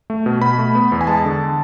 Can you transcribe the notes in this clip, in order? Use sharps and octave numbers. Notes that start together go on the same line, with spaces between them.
A3
B2
B2 B5
A3
B3
E2
G#5
G#3 A5
D3